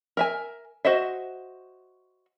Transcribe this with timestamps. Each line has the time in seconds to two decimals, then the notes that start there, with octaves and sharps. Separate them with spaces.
0.17 A#4 E5 G#5
0.85 F#4 C5 D#5 E5